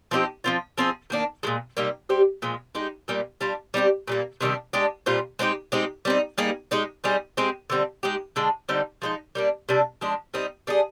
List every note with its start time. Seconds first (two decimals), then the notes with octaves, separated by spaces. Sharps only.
0.11 F3 C4 D#4 G4
0.44 F3 C4 F4
0.78 F3 C4 F4 G#4
1.10 D#3 A#3 D4
1.43 A#2 F3 G#3
1.77 C3 G3 A#3 D#4
2.09 G3 C4 G4
2.42 A#2 F3 G#3
2.75 G#3 D#4 G4
3.08 A#2 G3 A#3
3.41 G3 D4 F4
3.74 G3 C4 D#4 G4
4.07 A#2 G3 A#3
4.41 C3 D#3 G3 D4
4.73 G#3 D4 G4
5.06 A#2 G3 C4 F4
5.39 G#3 C4 D#4 G4
5.72 G#3 C4 D#4 G4
6.05 G3 C4 D#4
6.38 G3 A#3 D#4 G#4
6.71 G#3 D#4 G4
7.04 G3 C4 D#4 G#4
7.37 G#3 C4 G4
7.70 D3 G3 C4
8.03 G#3 D#4 G4
8.36 D3 G#3 D4
8.69 D3 G3 C4 D#4
9.02 F3 G#3 D#4
9.35 G3 A#3 D4
9.69 C3 G3 D4
10.01 F3 G#3 D4
10.34 G3 C4 D#4
10.67 G3 D4 G#4